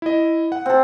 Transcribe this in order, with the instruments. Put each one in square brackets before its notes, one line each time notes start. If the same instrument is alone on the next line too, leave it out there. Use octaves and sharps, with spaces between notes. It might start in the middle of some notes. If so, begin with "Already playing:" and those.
[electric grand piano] E4 D#5
F#5
[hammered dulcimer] C4 A4